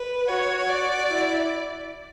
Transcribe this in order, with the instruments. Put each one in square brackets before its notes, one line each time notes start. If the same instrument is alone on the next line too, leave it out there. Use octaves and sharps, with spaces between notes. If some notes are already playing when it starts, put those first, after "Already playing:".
Already playing: [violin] B4
[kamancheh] F#4 [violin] C#5
[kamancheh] F#4 [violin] D5
[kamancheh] E4